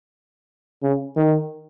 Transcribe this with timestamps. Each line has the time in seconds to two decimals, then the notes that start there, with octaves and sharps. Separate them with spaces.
0.83 C#3
1.16 D#3